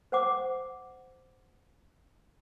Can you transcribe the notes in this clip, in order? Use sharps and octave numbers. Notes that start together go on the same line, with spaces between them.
C5 F#5 D6